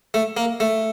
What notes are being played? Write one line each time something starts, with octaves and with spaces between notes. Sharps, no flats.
A3
A#3
A3